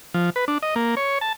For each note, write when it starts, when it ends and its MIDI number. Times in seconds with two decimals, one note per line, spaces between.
0.14 0.30 53
0.36 0.45 71
0.48 0.58 62
0.63 0.75 75
0.76 0.95 58
0.97 1.18 73
1.21 1.33 81